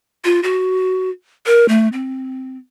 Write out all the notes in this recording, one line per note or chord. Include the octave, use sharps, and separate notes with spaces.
F4
F#4
A#4
A3
C4